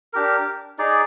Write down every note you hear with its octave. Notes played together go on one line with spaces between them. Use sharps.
D4 G4 A#4
D#4 G#4 D5